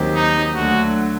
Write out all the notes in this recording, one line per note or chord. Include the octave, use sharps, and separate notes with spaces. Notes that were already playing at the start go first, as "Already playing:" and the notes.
Already playing: D#2 D#3 F#3 C4 G4
D#4
D2 D3 F#3 A3 F#4